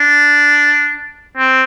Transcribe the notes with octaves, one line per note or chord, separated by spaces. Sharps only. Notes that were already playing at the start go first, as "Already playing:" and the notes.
Already playing: D4
C4